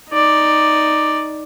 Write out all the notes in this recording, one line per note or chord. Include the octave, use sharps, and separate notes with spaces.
D#4 D5